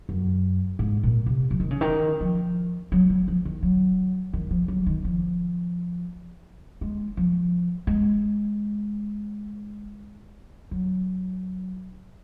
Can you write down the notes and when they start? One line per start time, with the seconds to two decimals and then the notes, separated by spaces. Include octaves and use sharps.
0.09 F#2
0.79 G#2
1.03 A#2
1.26 C3
1.51 F3
1.60 D#3
1.70 C#3
1.81 D#3
2.21 F3
2.92 F#3
3.10 F#3
3.28 F3
3.45 D#3
3.63 F#3
4.33 D#3
4.51 F3
4.68 F#3
4.86 D#3
5.04 F3
6.81 G#3
7.17 F3
7.87 G#3
10.71 F#3